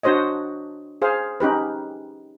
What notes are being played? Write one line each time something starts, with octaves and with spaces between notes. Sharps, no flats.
D4 F#4 C5 C#5 D#5
G#4 C5 F5
C#4 D#4 G4 B4